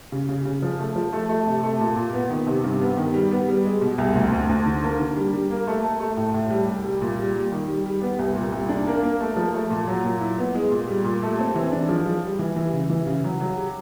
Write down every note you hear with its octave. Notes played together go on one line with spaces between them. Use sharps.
C#3
C#3
C#3
F3
A3
F3
A3
A3
C3
A3
A#2
A#2
B3
D#3
C3
G2
B3
D#3
G3
B3
G3
G#3
B2
C2
D2
D2
D2
D3
A#3
D3
G3
G3
A#3
A3
A3
A3
A2
A2
G3
C2
G3
A#2
G3
G3
D#3
G3
G3
B3
C2
A#2
C2
D4
A#3
A#3
A3
F3
A3
A#2
F#3
A#2
E4
B3
G#3
A#2
G3
A#2
A3
C4
E3
D4
F3
F3
G3
E3
E3
C#3
E3
C#3
F#3
F#3
G4